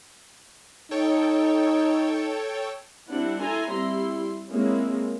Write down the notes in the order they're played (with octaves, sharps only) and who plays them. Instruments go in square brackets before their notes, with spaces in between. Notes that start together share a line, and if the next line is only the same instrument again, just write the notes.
[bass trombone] D#4 [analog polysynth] A4 C#5 G5
[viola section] G3 C4 D4 E4 F#5
E4 A4 G#5 A#5 C6
G3 C4 E4 C6
G#3 A#3 C4 C#4 E4